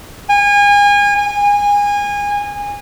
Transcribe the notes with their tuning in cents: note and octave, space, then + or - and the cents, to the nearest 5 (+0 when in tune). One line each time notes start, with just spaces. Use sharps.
G#5 -30
G#5 -25